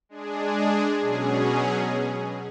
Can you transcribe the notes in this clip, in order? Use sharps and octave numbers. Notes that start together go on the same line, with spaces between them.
G#3 D4 G#4
B2 F#3 C#4 G#4